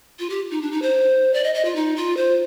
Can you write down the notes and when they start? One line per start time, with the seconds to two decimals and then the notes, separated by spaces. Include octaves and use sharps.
0.19 F4
0.30 G4
0.51 D#4
0.62 D4
0.72 D#4
0.82 C5
1.34 D5
1.44 D#5
1.54 D#5
1.65 F4
1.76 D#4
1.96 F4
2.17 C5